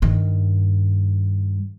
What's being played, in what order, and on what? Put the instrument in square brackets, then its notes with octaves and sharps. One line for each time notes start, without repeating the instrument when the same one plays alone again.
[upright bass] G2 D#3